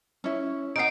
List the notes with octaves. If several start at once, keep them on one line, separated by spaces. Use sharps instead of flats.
C#4 E4
B3 C#4 D#4 C7 D7